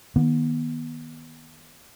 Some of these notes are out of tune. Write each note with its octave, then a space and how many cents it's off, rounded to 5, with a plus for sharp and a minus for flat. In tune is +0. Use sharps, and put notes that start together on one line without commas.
D#3 +0 B3 -35